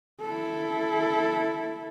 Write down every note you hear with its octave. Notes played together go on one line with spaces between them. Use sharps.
E4 A4